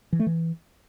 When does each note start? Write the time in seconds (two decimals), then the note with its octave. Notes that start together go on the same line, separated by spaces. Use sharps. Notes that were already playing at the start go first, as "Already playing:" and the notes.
0.12 E3
0.19 A3
0.26 E3